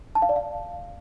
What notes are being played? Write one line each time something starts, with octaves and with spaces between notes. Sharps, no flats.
A5
F5
D5
F5